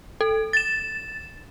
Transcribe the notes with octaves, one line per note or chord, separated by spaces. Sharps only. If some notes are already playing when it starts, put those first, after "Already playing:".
A4
A6 E7